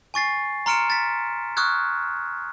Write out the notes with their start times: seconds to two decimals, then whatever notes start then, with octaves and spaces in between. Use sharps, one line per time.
0.14 G#5 C#6 A6 C7
0.66 A#5 C6 F6 C#7 D7 E7
0.90 A6 B6
1.57 C#6 D#6 F6 F#6 G#6